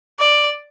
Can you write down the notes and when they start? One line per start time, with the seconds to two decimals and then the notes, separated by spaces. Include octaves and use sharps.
0.19 D5